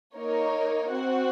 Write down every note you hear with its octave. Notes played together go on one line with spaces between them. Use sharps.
A#3 D#4 A#4 C#5
C4 F#4 C5 F#5